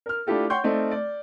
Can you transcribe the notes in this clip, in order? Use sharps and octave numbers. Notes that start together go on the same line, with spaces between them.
A#4 F6
A3 D4 E4 F4 G4 A4
C#5 F#5 G5 C6 C#6 G6
A3 C4 D#4 D5
D5